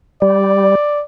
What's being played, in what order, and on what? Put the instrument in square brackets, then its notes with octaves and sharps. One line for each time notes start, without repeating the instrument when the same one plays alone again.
[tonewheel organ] G3 [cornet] D5